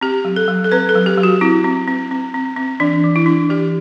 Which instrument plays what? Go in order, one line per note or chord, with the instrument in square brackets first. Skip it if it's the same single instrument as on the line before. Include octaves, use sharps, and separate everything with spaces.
[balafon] C4 G4
F#3
A4
F#3
A4
C4 B4
A4
F#3
G4
F#3
F#4
C4 E4
C4
C4
C4
C4
C4
E3 D4
E3
E4
D4
E3 G4